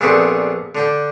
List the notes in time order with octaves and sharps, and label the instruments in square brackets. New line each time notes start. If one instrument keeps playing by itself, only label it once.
[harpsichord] A#1 B3 C4 D4 G#4 A4
D3 D4 G5